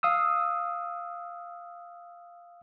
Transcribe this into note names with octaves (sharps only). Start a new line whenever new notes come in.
F5 D#6 E6